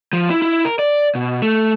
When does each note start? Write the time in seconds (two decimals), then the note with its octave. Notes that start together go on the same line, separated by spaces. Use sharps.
0.13 F3
0.30 E4
0.42 E4
0.65 A#4
0.79 D5
1.15 B2
1.42 A3